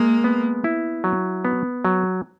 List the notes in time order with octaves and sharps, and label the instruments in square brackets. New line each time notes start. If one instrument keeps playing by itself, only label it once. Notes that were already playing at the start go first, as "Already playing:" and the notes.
Already playing: [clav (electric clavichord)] G#3 [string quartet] A#3
[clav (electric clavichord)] B3
E4
F#3
B3
F#3